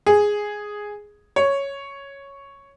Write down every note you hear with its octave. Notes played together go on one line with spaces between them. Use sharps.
G#4
C#5